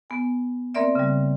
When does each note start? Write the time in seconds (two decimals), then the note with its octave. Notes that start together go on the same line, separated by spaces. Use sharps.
0.10 B3 G#5
0.75 A#3 C4 A#4 D5 E5
0.95 C#3 G3